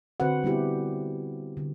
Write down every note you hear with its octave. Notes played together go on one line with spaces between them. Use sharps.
D3 C4 F#4 B4 C5 F#5
G3 B3 E4 G4
D3